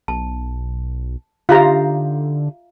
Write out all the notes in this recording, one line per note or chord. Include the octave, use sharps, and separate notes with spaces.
B1 A5
D3 D#4 F4 G4 C5 E5 F5 A#5